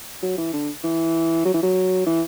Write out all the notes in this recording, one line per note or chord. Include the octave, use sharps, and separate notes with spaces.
F#3
E3
D3
E3
F#3
E3
F#3
E3